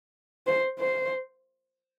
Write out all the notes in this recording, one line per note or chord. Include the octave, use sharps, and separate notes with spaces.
C5
C5